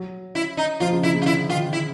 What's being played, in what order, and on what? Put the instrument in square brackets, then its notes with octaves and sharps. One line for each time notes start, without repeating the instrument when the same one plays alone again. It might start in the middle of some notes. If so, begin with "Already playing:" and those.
Already playing: [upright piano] F#3
[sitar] E4
D#4
[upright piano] F3 [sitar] F4
[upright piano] C#3
[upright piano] C#3 [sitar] E4
[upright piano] C#3
[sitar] F4
[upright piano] D3 [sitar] E4
[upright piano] D#3 [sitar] F4
[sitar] E4